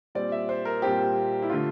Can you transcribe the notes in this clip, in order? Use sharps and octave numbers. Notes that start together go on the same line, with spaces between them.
A#2 G3 C4 D5
E5
C5
A#4
A#2 G3 C4 G4
E4
D3 A3 F4